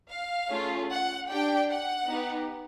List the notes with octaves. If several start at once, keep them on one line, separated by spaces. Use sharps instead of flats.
F5
A3 C#4 F4 G#4
F#5
D4 G4 G5
F#5
B3 D#4 G4